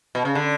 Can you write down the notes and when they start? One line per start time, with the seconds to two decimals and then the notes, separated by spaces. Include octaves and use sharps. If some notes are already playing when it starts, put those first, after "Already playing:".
0.15 B2
0.25 C#3
0.35 D3